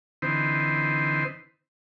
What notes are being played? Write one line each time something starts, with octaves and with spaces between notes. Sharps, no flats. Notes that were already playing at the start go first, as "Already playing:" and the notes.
D3 E3 C4 D#4 B4 C5